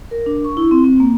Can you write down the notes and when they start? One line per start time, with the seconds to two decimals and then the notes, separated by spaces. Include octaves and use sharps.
0.11 A#4
0.26 D4
0.45 C#6
0.57 E4
0.71 C4
0.84 C4
1.00 A#3